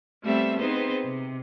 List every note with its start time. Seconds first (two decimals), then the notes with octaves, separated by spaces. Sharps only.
0.23 G3 A3 B3 C4 E5 E6
0.59 B3 C4 D#4 G#4 B4 C5
1.03 C3